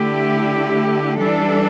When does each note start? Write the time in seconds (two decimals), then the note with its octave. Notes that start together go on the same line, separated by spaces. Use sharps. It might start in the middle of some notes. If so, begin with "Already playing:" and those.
Already playing: D3 A3 E4 G4
1.19 E3 G3 D4 A4